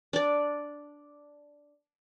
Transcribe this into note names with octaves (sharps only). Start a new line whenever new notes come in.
D4 D5